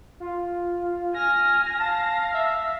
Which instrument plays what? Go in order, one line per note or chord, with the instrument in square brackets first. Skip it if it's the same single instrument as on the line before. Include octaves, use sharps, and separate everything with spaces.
[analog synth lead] F4
[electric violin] G#5 F6 [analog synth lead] A#6
[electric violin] F5 [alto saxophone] A5
[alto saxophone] E5